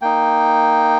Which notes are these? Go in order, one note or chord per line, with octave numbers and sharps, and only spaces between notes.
A#3 D#4 G5